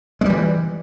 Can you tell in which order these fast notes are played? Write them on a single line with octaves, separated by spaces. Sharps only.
G#3 G3 E3